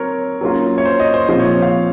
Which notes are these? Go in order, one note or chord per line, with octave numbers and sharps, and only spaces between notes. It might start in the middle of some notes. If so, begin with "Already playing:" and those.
Already playing: F#3 C4 A#4 C#5
F#3 A#3 C#4 F4
C#5
C5
D#5
C5
A#2 F3 C4 F4 C5
C#5
F5